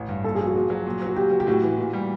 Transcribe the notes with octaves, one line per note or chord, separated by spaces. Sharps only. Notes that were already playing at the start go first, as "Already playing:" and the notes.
Already playing: A1 E3
G2
A#2 A4
G#4
F3 F#4
A#2 F#4
F#3
A#2
F#3 F#4
A#2 G4
F#3
G4
A2 F#4
E3
A#2
G3